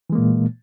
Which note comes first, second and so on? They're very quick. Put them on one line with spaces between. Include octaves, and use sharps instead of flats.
E3 G#3 A#3 A#2